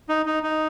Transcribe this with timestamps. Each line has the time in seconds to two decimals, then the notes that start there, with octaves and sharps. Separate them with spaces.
0.09 D#4
0.26 D#4
0.43 D#4